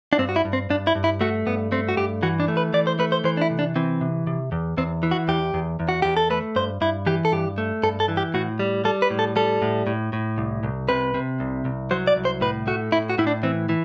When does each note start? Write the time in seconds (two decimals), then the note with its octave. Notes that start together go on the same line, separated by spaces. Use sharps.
0.13 D4
0.19 G2 C4
0.29 F#4
0.36 E4
0.45 G2
0.53 C4
0.70 G2 D4
0.87 E4
0.95 G2
1.04 E4
1.21 A3 F#4
1.46 G2 B3
1.72 A3 C4
1.89 F#4
1.97 G2 G4
2.23 E3 F#4
2.40 D4
2.48 A3
2.57 B4
2.74 E3 D5
2.87 C5
2.99 A3 B4
3.12 C5
3.24 E3 C5
3.37 D4
3.42 E4
3.50 C3
3.59 D4
3.76 E3 C4
4.01 C3
4.27 C3
4.52 E2
4.77 E2 C4
5.03 E3
5.11 F#4
5.28 E2 G4
5.54 E2
5.80 E2
5.89 F#4
6.02 E2 G4
6.17 A4
6.30 A3 B4
6.56 G2 C5
6.81 G2 E4
7.06 E3 G4
7.25 A4
7.32 G2 G4
7.58 A3
7.83 G2 A4
8.00 A4
8.08 E3
8.17 G4
8.34 A2 F#4
8.59 G3
8.85 G3 A4
9.02 B4
9.10 A2
9.19 A4
9.36 G3 A4
9.62 A2
9.87 A2
10.13 A2
10.38 C2
10.63 C2
10.89 C3 B4
11.14 C3
11.40 C2
11.65 C2
11.91 F#3 C5
12.07 D5
12.16 C2
12.25 C5
12.41 A2 B4
12.67 A3 F#4
12.92 A2 E4
13.10 F#4
13.18 A2 E4
13.27 D4
13.43 E3 C4
13.69 E3